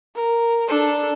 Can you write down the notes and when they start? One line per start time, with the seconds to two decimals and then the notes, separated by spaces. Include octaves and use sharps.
0.15 A#4
0.68 D4 A4